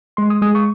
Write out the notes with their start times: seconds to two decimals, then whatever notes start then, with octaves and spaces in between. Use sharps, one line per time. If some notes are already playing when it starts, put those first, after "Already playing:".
0.17 G#3 C6
0.30 D#6
0.42 G#3 D#6
0.55 C#6